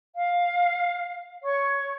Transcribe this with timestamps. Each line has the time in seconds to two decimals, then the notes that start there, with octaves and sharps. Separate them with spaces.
0.14 F5
1.44 C#5 C#6